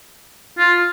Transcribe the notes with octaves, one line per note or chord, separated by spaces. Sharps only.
F4